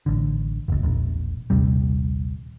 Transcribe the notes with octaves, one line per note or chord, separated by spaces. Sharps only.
A1 D3
F1 C#2
E1 A#1
A#1 D#2 C3 G3